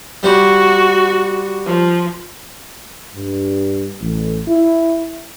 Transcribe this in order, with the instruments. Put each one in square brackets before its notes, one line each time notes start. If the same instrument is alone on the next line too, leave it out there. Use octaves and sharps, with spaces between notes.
[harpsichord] G3 C5 [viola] F#4
[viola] F3
[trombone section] G2
A1
E4